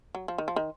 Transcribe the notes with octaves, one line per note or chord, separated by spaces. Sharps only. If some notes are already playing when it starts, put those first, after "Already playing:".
F#3
F3
D#3
F3
D#3